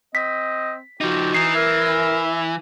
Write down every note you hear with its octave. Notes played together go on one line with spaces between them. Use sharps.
C4 D#5 B6
F3 D#4 F#4 G4
E3 D#4 C7
A#4 E5